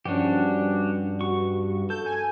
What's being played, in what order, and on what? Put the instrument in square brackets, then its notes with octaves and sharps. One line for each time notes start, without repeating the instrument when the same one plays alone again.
[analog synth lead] G2 [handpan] F3 C#4 [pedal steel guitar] D4 F#4 G4
[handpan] F#4 [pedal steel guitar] C#6
[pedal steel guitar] A4 [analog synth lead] G6
[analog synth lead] G#5